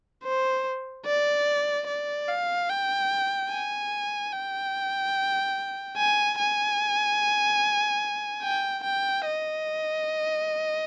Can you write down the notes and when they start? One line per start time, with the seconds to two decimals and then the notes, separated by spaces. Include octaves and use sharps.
0.23 C5
1.05 D5
1.87 D5
2.28 F5
2.70 G5
3.50 G#5
4.32 G5
5.97 G#5
6.39 G#5
8.42 G5
8.83 G5
9.26 D#5